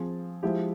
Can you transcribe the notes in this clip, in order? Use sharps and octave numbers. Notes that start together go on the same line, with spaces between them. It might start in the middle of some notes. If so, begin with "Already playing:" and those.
Already playing: F3 C4 F4 G#4
F3 G#3 E4 G4